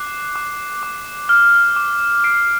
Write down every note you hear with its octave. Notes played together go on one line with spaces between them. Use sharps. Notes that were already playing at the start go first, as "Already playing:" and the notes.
Already playing: D6 F#6 C7
D6
D6
F6
D6
D6 C7 D7